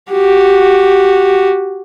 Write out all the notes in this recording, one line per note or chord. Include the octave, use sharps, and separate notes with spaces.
F#4 G4